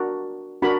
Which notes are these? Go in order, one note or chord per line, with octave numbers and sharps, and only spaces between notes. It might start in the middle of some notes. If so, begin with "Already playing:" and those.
Already playing: D4 F#4 A#4
D4 F#4 A#4 B5